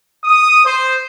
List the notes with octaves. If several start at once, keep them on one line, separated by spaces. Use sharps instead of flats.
D#6
C5